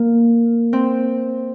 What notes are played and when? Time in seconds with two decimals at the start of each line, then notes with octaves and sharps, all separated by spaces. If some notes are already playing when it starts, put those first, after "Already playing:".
Already playing: A#3
0.73 C4